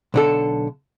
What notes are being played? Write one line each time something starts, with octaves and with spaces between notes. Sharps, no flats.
B1 D3 A4